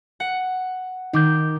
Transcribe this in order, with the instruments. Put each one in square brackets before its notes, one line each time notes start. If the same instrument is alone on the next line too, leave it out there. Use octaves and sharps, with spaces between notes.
[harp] F#5
[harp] D#3 [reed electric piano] D#4 D6 G6